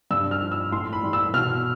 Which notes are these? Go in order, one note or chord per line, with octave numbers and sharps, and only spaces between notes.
G2 E6
F6
F3
E6
A2 C6
B5
E3 G3
E6
B2 F6